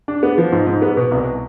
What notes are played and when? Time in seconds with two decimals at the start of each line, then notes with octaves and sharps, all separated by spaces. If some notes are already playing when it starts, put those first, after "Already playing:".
0.08 D4
0.23 B3
0.38 F3
0.52 G#2
0.67 G#2
0.82 B3
0.97 B2
1.11 C2